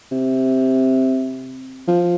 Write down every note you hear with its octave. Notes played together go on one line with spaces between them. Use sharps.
C3
F3